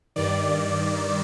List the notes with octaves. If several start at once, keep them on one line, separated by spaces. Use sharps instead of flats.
G2 D#3 D5